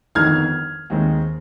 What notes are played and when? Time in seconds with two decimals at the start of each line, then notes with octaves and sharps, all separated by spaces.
0.15 G1 F2 D#3 B3 D#4 F6 G#6
0.90 D#2 D#3 G#3 C4